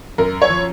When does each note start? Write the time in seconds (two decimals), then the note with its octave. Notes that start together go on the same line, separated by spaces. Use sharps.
0.18 F#2 A#4
0.42 C#5
0.50 F3